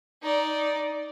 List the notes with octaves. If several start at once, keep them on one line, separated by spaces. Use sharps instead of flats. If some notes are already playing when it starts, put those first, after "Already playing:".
D#4 D5